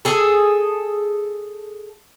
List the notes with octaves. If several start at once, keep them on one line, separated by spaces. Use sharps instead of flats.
G#4 A4